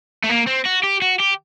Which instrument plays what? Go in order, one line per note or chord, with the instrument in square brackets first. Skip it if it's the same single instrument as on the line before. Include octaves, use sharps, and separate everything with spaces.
[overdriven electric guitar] A3
A#3
C4
F#4
G4
F#4
G4